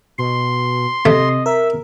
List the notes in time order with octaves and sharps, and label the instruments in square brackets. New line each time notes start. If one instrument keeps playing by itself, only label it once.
[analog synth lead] B2 [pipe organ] C6
[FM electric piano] C3 [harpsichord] A3 [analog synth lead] D#5
[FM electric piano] A#4 [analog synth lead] E5